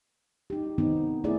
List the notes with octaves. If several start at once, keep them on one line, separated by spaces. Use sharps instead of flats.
D#4 G4
D#3 B3 C4 D#4
A3 C4 E4 G#4 D5